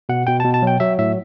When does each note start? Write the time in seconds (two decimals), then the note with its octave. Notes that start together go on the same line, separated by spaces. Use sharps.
0.09 B2 F#5
0.27 B2 G5
0.40 A5
0.45 B2
0.54 A5
0.62 F#3 G5
0.80 F#3 E5
0.98 A2 E5